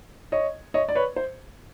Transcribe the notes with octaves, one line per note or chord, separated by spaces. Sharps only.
C#5 D#5
C#5 D#5
D5
B4 C#5
C5